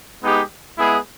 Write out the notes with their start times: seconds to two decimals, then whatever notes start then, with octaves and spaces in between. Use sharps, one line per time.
0.22 G#3 B3 D#4 G4
0.77 G#3 B3 E4 G#4